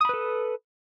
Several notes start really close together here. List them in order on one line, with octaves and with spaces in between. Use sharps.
D#6 B5 B4 A4